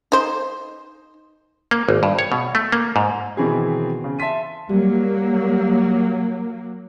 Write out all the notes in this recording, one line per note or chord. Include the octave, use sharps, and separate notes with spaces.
D#4 C5
A#3
G#1
G2
C#5
B2
A3
A#3
G#2
B2 D#3 E3 C4 E4 G#4
C#3
E5 A5 C6 B6 D#7
F#3 G3 A#3